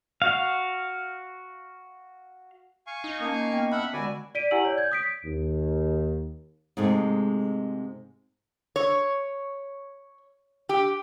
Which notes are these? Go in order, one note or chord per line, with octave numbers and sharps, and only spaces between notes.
F#4 F5
F5 G#5 C#6
D#4
A#3 C#4 A5
B3 G5
E5 F#5 A5 B5 E6 F6
D#2 D3 G#3 F#4 D5 G#5 B5 E6
D5 B6 D7 D#7
E4 G4 F#5 G#5 E6 F#7
C#5 D5
G6 G#6
D#6 B6 D7
D#2
G#2 C3 G#3 A3
C#5
G4